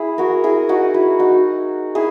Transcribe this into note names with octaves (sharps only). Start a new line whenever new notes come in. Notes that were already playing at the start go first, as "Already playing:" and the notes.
Already playing: E4 G#4
F#4 A#4
E4 G#4
D#4 F#4
E4
D#4 F#4
E4 G#4